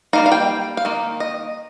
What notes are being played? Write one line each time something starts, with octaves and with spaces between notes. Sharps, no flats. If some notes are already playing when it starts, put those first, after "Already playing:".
G3 A#3 D#4 F5
F5
G5
F5
D#3 A#3
D#5